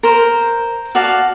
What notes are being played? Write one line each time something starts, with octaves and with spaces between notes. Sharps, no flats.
A#4 C5
F#4 D5 F5 A5